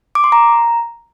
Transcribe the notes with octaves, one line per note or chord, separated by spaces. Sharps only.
D6
C6
A#5